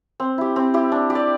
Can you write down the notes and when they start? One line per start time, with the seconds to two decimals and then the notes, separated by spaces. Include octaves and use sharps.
0.20 C4
0.38 E4 G4
0.56 C4
0.74 E4 G4
0.92 D4
1.10 G4
1.15 D5